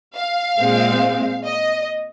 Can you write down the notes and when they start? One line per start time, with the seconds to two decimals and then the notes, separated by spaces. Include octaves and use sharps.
0.16 F5
0.60 A#2 G#3 C4
1.46 D#5